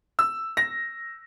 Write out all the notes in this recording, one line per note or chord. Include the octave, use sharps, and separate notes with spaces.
E6
A#6